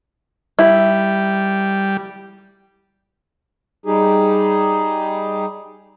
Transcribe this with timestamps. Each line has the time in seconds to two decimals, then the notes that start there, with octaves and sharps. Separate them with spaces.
0.59 G3 E4
3.86 G3 D#4 G4 G#4